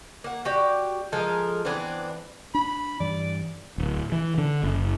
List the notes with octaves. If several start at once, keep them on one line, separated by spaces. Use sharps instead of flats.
A#3 F#5
F#4 G4 D5
F3 G#3 A4 A#4
E3 B3 C4 D4
D4 B5
G2 E3 D5
D1
E3
D3
F#1